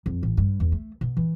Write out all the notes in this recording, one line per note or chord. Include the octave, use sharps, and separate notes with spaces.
F2
A1
G2
E2
A3
B2
E3